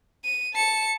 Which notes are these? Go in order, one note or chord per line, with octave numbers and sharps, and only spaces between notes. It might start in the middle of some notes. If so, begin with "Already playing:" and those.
D#7
A5 C#7